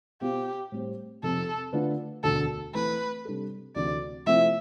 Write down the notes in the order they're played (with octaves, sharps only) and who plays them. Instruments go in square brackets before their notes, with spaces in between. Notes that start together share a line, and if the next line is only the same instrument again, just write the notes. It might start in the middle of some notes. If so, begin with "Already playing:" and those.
[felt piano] B2 B3 F4 C5 F5 [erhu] G4
[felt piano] A2 G3 C4 G4 C5
[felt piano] F1 F2 C3 [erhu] A4
[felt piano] D3 A3 D4 F4 B4
[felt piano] E1 D2 D3 [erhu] A4
[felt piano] E3 A3 C4 E4 [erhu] B4
[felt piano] C3 G3 D4 A4
[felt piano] D2 C3 E3 [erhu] D5
[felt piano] C3 F3 A3 C4 E4 [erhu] E5